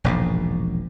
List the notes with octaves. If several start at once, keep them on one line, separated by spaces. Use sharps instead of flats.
E1 A#1 G#2